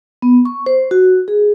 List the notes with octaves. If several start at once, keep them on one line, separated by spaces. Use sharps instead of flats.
B3
C#6
C5
F#4
G#4